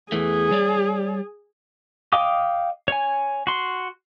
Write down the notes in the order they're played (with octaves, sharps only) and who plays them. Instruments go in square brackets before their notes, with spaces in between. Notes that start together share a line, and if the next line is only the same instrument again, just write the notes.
[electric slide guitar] E2 E3 A3 [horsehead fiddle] G#4
[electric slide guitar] G3 C#5 D5
[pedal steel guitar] D#5 F5 G5 D6 D#6
C#5 G#5
F#4 C6